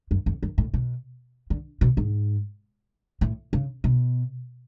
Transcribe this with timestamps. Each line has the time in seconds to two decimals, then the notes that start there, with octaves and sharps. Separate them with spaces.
0.11 F#2
0.26 F2
0.43 F#2
0.58 A2
0.74 B2
1.50 D3
1.81 B2
1.97 G#2
3.21 A2
3.53 C#3
3.84 B2